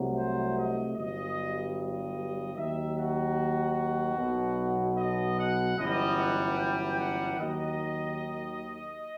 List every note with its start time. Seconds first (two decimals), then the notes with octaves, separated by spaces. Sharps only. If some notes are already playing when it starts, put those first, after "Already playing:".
Already playing: C2 C3 F#3 A3
0.16 C5
0.56 D#5
0.96 G1 G2 F#3 D#5
1.76 D#5
2.56 D#2 D#3 F#3 E5
2.96 F#4
4.16 B1 B2 F#3
4.96 D#5
5.36 F#5
5.76 G1 F#2 E3 G3 D#5
6.17 F#5
6.57 G5
6.97 F#5
7.37 D#2 D#3 F#3 D#5